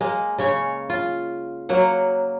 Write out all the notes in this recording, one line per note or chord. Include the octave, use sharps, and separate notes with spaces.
G#3 A#3
C#3 C#4 C#5
F4
F#3 A#3 F#5